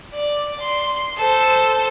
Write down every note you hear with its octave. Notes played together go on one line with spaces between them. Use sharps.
D5
C6
A4 C5